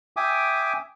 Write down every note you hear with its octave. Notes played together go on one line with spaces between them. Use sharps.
E5 G5 G#5 D6 D#6